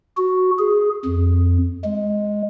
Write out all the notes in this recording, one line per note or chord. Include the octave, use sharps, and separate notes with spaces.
F#4
G#4
F2
G#3